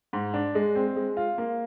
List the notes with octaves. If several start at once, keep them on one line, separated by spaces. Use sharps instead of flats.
G#2
D4
G#3
C4
G#3
F4
A#3